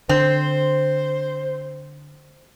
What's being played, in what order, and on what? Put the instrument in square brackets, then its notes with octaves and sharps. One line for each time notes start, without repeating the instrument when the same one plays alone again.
[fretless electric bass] D3 [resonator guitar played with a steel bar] C4 [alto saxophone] C5